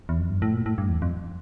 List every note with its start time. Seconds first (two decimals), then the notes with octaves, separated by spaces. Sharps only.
0.09 E2
0.20 F2
0.30 G2
0.42 A2
0.54 A#2
0.66 A2
0.78 G2
0.89 E2
1.02 F2